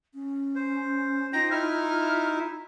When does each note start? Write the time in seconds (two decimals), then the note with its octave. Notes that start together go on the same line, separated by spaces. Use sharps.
0.14 C#4
0.56 C5
1.33 D#4 F4 C5 G5 A#6
1.51 D#4 E4 E5 F6